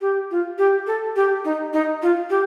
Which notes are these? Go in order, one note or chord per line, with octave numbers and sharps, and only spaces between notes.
G4
F4
G4
A4
G4
D#4
D#4
F4
G4